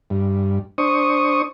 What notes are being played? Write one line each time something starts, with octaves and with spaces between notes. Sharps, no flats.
G2
D4 C5 C#6 D#6